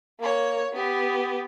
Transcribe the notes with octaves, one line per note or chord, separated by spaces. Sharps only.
A#3 C#5
B3 G4